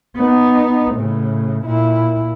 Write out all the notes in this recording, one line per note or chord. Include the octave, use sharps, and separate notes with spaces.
B3 D#4
A2 C#3
A#2 E4